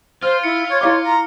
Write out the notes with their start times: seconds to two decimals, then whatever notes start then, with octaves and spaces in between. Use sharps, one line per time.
0.22 F4 C5 F6
0.44 E4 C#7
0.69 C#5
0.81 E4 C#5 F5 D6
1.04 A#5